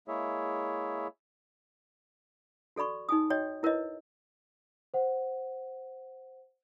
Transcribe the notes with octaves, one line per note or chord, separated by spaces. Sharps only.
G#3 A#3 E4 G#4 C#5 E5
F#4 A4 D5 B5 C#6
D#4 G#5 D#6
F#4 C#5 D#5 G5
E4 A#4 B4 C#5 D#5
C5 F#5